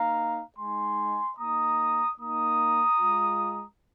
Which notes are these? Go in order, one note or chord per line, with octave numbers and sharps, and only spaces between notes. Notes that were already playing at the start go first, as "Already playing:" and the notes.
Already playing: A#3 D#4 F5 A#5
G#3 D#4 G#5 C6
A#3 D#4 A#5 D#6
A#3 D#4 A#5 D#6
G#3 F4